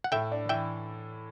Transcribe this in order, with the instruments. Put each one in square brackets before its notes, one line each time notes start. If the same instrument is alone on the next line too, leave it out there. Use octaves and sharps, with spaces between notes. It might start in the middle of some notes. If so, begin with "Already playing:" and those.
[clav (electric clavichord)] F#5
[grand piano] A2 [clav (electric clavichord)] E5 G5
[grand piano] D4
[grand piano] E3 [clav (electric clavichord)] E5 G5